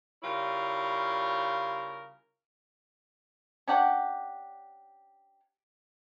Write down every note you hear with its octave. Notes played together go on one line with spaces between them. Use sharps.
C#3 G3 E4 F4 A#4 C#5
C#4 D4 G4 F#5